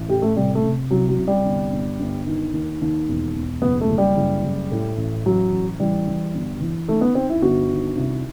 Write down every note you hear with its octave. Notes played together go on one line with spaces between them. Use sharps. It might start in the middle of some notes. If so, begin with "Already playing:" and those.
Already playing: A1
A2 G4
A3
C3 G3
A3
C3
C2 F#3
F#3
C2
G3
G1
G1
G1
D#3
D#2
D#2
E1
E1
F#1 B3
A3
F#1
G3
F#1
F#1
A2
A1
A1 F#3
A1
E3 G3
E3
G1
E3
D#3 A3
B3
D#3 C4
E4
G1 F#4
D#3
C2